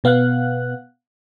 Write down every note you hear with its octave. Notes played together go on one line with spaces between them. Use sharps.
B2 B3 F5 F#5 F#6